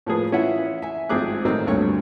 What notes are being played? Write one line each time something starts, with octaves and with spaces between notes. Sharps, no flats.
A2 F3 A#3 G#4 B4
E3 C#4 E4 F4 E5 F#5
E5 G#5
G#1 F3 C4 G#4 D6 F#6
A1 D#3 F#3 C4 D#4 E6
D2 G2 A#2 C#5 C#6